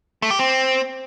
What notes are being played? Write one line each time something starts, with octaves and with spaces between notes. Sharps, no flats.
A3
G4
C4